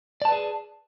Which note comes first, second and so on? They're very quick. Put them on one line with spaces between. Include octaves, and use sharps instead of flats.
D5 A5 B4 G#4